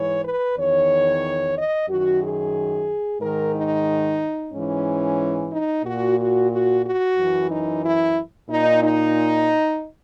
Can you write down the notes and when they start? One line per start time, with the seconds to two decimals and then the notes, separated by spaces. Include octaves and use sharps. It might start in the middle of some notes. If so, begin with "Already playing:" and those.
Already playing: G#2 E3 C#5
0.24 B4
0.57 E2 D#3 C#5
1.57 D#5
1.89 F#2 D#3 F#4
2.22 G#4
3.21 G#2 D#3 A#4
3.54 D#4
4.53 G#2 E3 C#4
5.52 D#4
5.85 A#2 F#4
6.19 F#4
6.51 F#4
6.84 F#4
7.18 F#2 E3
7.50 D#4
7.84 E4
8.49 A#2 D#4
8.82 D#4